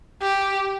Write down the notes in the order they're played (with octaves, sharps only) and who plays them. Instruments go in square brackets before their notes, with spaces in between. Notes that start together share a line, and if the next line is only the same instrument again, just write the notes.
[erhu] G4